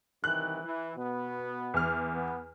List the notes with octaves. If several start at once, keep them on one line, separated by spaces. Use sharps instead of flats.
C2 D#3 E3 F#6
E3
B2 B3
E2 F6
B3